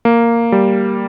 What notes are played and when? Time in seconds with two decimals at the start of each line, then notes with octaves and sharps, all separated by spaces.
0.05 A#3
0.52 G3